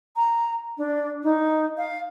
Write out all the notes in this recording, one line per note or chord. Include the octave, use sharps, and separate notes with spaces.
A#5
D4
D#4
F5